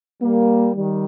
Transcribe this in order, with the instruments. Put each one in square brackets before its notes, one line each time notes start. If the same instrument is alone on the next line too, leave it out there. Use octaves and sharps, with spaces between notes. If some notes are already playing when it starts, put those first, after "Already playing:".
[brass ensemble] G3 A#3
D#3 G3